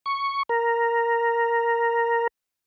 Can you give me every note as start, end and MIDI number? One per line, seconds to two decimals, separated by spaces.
0.06 0.43 85
0.49 2.27 70